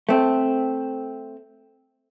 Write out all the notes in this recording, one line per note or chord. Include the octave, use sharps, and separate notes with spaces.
A3 C4